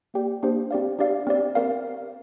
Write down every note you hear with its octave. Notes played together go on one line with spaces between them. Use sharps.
A#3 G4 D5 G5
A#3 D4 G4 C5
C4 G4 D5 F5
D4 G4 D5 F5
C4 G4 D5
C4 A#4 F5